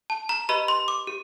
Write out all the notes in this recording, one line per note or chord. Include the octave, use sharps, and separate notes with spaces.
A5
A#5
G4 B4 D#5 B5
C6
D6
G4